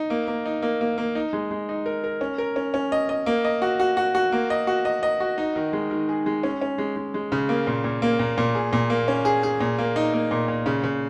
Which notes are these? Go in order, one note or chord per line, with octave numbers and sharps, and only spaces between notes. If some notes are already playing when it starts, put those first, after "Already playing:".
Already playing: D#4
A#3
A#3
D#4
A#3
A#3
A#3
D#4
G#3
G#3
D#4
A#4
A#4
C#4
A#4
C#4
C#4
D#5
D#5
A#3
D#5
F#4
F#4
F#4
F#4
A#3
D#5
F#4
D#5
D#5
F#4
D#4
D#3
G#3
D#3
G#4
G#3
C#4
C#4
G#3
G#3
G#3
C#3
A#3
A#2
A#2
A#3
A#2
A#2
G#4
A#2
A#3
C#4
G#4
G#4
A#2
A#3
D#4
A#3
A#2
A#2
C#3
C#3